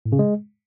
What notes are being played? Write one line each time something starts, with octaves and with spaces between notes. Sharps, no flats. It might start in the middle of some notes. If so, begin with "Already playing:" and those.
A2
C#3
G#3